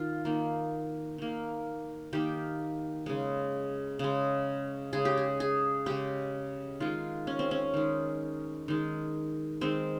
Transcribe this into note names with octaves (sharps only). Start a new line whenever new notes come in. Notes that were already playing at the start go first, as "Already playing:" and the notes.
Already playing: D#3 F4
D#3 A#3
D#3 A#3
D#3 A#3 G4
C#3 G#3
C#3 G#3
C#3 G#3 G#4
G4
G#4
G#4
C#3 G#3 G4
D#3 G#3 F4
C#4
C4
C#4
D#3 G#3
D#3 G#3
D#3 G#3 C4